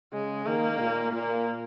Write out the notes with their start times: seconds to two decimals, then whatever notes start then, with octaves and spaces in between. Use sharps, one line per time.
0.12 C#3 G#3
0.46 D#3 A#3
0.80 A#2
1.13 A#2 A#3